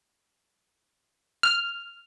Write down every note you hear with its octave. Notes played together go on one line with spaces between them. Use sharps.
F6